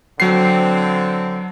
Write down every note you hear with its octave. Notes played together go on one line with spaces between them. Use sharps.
D3 F#3 C4 C7